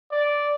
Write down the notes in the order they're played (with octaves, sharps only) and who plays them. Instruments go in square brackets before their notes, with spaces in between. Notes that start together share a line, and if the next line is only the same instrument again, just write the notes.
[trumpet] D5